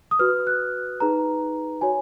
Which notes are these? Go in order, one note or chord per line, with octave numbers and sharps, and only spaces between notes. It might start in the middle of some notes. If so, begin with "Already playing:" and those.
D#6
F#4 B4 F6
F#6
D#4 G#4 B4 A#5
F#4 C#5 G#5